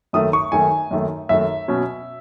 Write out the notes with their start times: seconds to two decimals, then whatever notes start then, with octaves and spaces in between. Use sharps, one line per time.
0.13 F#2 D#3 A3 D#6
0.33 C#6
0.52 F#2 D#3 A3 G#5
0.91 F#2 D#3 A3
1.29 F#2 D#3 A3 E5
1.68 B2 F#3 C#4